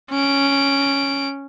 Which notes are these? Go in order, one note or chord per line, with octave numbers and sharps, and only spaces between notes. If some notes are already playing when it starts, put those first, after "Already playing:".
C#4 D7